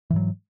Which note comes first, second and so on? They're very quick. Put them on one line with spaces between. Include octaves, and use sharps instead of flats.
E3 G#2 F#3